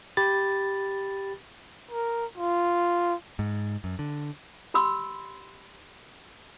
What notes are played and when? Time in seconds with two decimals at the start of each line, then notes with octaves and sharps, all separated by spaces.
0.17 G4 B5 A6
1.91 A#4
2.37 F4
3.39 G#2
3.84 F#2
3.99 D3
4.74 G4 B5 C6 E6